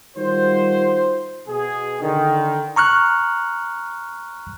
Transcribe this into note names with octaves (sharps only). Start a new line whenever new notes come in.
D#3 G3 F4 F#4 C5
B2 G#4
D3 D#3
A#5 C#6 F6 F#6